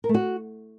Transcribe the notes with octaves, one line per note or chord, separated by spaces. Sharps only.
A#4
A3
F#4